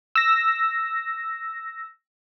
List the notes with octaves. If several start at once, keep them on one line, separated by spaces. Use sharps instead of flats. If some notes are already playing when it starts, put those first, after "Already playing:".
E6 A#6